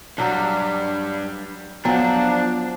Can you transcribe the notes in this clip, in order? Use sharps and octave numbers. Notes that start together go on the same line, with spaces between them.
G2 F#3 G3 D4
F3 F#3 B3 D4